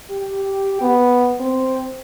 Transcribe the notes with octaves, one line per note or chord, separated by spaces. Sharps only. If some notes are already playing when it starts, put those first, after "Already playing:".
G4
B3
C4